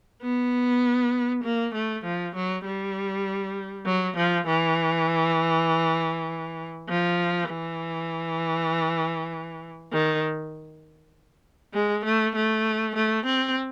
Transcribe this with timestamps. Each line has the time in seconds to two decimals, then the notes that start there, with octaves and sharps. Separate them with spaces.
0.23 B3
1.43 A#3
1.74 A3
2.05 F3
2.35 F#3
2.65 G3
3.86 F#3
4.17 F3
4.47 E3
6.89 F3
7.49 E3
9.92 D#3
11.74 G#3
12.05 A3
12.35 A3
12.96 A3
13.26 C4